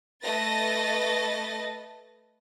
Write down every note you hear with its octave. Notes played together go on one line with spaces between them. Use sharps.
A3 B4 D#5 A6 A#6